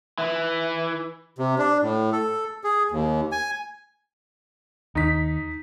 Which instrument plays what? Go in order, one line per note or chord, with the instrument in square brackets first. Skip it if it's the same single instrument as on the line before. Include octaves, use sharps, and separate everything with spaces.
[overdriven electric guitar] E3
[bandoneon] C3
D4
A2
A4
G#4
D#2
G#5
[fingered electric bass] D#2 [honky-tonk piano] D#4 B6